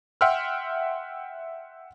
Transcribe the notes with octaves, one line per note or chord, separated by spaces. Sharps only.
E5 F#5 G5 C6 E6 F6